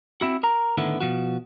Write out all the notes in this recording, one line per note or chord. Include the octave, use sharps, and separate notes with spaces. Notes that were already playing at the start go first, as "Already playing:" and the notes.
C4 E4 F#4
A#4 A#5
A2 D3 D#3 B3 E4
B2 F3 F#4